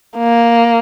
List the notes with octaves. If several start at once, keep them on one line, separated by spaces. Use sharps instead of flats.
A#3